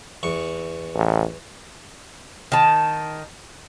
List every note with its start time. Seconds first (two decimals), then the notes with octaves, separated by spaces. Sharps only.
0.23 E2 C#6
0.95 A1
2.52 D#3 A5